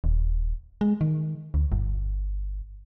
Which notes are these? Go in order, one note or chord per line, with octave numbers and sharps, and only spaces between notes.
D#1
G#3
D#3
D2
G1